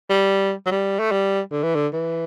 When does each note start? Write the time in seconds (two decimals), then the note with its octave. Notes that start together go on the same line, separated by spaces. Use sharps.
0.10 G3
0.66 F#3
0.71 G3
0.99 A3
1.12 G3
1.52 D3
1.63 E3
1.75 D3
1.93 E3